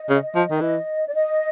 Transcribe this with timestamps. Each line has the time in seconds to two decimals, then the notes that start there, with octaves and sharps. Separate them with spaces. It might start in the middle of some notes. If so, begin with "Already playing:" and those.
Already playing: D#5
0.10 C#3
0.35 F3
0.51 D#3
0.61 E3 D#5
1.06 D5
1.14 D#5